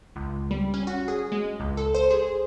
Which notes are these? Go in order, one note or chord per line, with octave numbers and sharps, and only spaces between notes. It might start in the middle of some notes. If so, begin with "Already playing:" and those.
C#2
G3
C#4
F#4
G#4
G#3
C#2
A4
C5
G#4